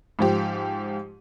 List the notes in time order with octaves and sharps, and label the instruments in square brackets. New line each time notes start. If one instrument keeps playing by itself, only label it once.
[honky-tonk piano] G#2 F3 G4